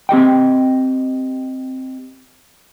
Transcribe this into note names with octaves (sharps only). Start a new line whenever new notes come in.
C4 G4 D#5 G5